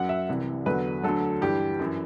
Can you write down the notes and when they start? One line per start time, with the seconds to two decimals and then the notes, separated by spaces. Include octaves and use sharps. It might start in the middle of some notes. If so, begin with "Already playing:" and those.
Already playing: F#2 F#3 F#5
0.09 E5
0.29 C2 C3 E3
0.66 E2 D3 F#3 B4
1.03 D2 D3 F#3 A4
1.41 G2 E3 G4
1.79 F#2 E3